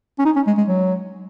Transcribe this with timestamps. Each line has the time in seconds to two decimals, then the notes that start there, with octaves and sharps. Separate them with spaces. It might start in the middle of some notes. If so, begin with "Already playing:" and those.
0.19 C#4
0.25 D#4
0.36 C#4
0.47 G#3
0.58 G#3
0.68 F#3